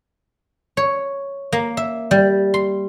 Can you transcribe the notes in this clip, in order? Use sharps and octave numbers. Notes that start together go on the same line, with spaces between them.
C#5
A#3
E5
G3
C6